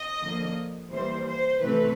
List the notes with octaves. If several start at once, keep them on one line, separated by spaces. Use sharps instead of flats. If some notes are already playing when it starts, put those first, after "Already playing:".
Already playing: D#5
D3 F3 A#3
E3 G3 A#3 C5
C5
C3 E3 A3 C4 B4